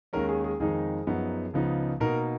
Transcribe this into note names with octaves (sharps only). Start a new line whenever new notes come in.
D#2 D#3 G#3 C#4 A#4
G#4
G#4
F2 D#3 G#3 D#4 G#4
F#2 F3 B3 D#4
C#2 C#3 F3 B3 D#4
B2 A#3 D#4 A#4